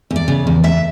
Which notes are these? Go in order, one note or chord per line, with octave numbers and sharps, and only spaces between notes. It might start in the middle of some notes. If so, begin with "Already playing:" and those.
E2
D5
C#3
E2
E2 E5